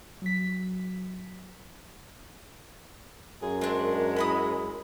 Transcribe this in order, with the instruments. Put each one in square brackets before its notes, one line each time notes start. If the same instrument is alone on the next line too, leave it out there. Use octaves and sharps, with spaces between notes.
[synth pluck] F#3 B6
[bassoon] F#2 [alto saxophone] G#4
[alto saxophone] G#3 [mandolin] C4 D4 [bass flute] A#4
[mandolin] E4 B5 D#6